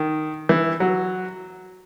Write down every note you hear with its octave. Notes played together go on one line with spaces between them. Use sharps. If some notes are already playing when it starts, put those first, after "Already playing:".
Already playing: D#3
E3
F#3